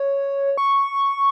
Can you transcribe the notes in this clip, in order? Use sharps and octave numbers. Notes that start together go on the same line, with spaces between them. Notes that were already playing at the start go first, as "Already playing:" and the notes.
Already playing: C#5
C#6